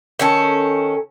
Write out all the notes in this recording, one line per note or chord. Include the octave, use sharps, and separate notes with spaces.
D#3 C#4 A4